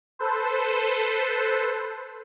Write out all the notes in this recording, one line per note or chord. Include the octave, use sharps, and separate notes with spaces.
A4 B4 C5